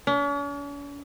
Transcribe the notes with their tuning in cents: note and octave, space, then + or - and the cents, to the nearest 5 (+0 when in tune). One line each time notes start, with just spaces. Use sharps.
C#4 +45